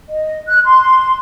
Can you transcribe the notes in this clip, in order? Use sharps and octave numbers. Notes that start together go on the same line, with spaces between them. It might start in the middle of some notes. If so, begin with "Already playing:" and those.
D#5
F#6
C6